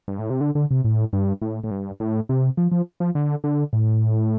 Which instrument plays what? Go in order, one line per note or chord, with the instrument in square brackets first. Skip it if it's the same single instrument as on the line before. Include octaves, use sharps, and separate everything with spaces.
[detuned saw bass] G2
A2
C3
D3
D3
C3
A2
G2
A2
A2
G2
A2
C3
F3
F3
F3
D3
D3
A2